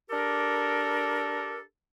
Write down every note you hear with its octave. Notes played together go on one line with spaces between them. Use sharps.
D4 G4 A4 A#4